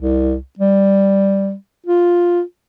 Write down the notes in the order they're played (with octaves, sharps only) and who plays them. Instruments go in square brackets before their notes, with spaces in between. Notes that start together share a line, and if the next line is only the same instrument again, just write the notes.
[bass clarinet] C2
G3
F4